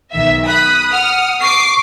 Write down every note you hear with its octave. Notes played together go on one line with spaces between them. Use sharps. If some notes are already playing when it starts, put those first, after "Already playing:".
B1 D#3 E5
B5 D#6 F#6
F#5 F6
C#6 D6 C7